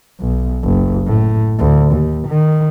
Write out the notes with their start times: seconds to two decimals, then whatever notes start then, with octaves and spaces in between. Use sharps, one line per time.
0.21 B1
0.64 F#1
1.07 A2
1.59 D2
1.92 D#2
2.28 D#3